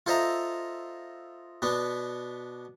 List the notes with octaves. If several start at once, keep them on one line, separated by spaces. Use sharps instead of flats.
F4 A4 C5 D#5 E5 A#5
B2 B3 D4